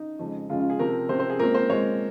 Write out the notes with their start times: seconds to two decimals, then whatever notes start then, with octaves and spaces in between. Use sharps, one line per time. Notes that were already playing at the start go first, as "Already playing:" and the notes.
Already playing: D#4
0.19 F2 C#3 G#3
0.49 F2 C#3 G#3 F4
0.59 F4
0.70 G#4
0.79 C3 F3 C4 A#4
1.09 C3 F3 C4 C5
1.19 C5
1.30 G#4
1.39 A#2 G#3 C4 A#4
1.54 C5
1.70 A#2 G#3 C4 C#5